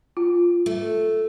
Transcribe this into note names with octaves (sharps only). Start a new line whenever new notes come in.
F4
A3